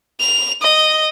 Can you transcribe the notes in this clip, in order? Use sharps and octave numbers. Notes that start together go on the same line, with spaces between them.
F7
D#5